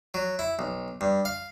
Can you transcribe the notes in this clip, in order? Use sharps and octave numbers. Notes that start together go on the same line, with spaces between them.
F#3
E4
B1
G2
F5